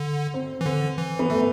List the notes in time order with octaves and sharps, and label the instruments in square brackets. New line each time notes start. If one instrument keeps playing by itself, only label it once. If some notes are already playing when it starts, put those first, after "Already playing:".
Already playing: [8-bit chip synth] D3
[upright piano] C4
[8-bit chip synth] E3
[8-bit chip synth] D3 [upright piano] C4
[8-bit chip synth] E3
[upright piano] B3
[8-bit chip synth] E3 [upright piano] A3